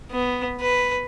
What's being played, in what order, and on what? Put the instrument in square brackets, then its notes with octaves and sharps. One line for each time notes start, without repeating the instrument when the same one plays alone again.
[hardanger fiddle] B3
B4